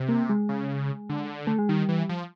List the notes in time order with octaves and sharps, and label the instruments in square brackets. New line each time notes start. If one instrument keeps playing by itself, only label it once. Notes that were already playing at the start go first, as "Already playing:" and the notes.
Already playing: [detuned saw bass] C3
[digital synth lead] A#3
G#3
[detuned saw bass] C#3
D3
[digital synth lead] A3
G#3
[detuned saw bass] D#3 [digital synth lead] G3
[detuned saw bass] E3
F3